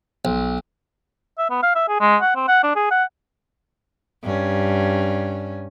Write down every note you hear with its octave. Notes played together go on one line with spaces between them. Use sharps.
B1
E5
B3
F5
E5
G#4
G#3
F#5
C4
F#5
D4
G#4
F#5
G2 C#4